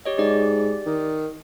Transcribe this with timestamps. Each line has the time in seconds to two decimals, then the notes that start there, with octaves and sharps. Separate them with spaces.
0.05 G4 C#5 D#5
0.18 G#2 G4 D5
0.86 D#3